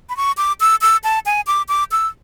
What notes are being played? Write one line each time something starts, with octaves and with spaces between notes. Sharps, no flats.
B5
C#6
D6
E6
E6
A5
G#5
D6
D6
E6